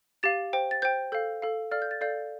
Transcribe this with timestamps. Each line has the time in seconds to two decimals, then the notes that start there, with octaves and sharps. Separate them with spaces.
0.23 G4 F5 A6
0.53 C5 G5
0.71 A6
0.82 C5 G5 G6
1.12 A4 F5 G6
1.42 A4 F5
1.71 A4 D5 F5 F6
1.82 G6
1.91 A6
2.01 A4 D5 F5 G6